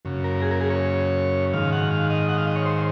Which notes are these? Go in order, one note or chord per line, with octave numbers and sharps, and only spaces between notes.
F#2 C#3
A#4
G#4
A#4
G#4
C#5
G#2 D#3 F5
F#5
F5
D#5
F#5
F5
D#5
C#5
C5